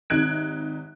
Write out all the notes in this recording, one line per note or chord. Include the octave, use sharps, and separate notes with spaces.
G#1 C3 D#4 F#6 G#6 D7